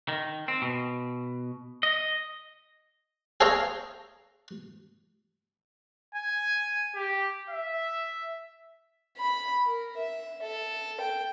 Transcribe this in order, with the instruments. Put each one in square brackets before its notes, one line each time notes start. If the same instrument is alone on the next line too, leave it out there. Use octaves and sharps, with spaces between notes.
[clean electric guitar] D#3
C4
B2
D#5
[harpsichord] G#4 A4 C5 C#5 F5 A#5
[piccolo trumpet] G#5
G4
E5
[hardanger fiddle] B5
A#4
E5
A4
G5